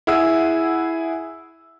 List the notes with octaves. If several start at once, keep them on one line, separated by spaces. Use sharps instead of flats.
E4 G#4 F#5 E6